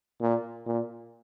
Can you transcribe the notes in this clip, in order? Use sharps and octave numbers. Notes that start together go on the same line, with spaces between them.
A#2
A#2